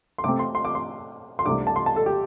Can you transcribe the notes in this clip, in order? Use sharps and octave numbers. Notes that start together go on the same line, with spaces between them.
C6
C3 A3 C4 D6
C6
C6
D6
C6
C6
C2 C3 A3 D4 D6
A5
C6
A5
A4
G4